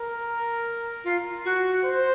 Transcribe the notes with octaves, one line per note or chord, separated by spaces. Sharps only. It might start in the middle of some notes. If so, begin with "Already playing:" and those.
Already playing: A#4
F4
F#4
C5